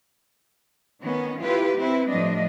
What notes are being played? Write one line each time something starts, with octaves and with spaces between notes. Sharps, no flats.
D#3 B3 C#4
E4 F4 G4 B4
C4 E4 B4
A2 F3 G3 D4 D#5